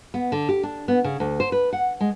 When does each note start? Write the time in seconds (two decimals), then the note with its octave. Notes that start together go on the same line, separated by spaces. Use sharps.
0.14 B3
0.32 D3
0.49 G4
0.63 D4
0.88 B3
1.04 C#3
1.20 D2
1.40 C5
1.52 B4
1.73 F#5
2.01 G#3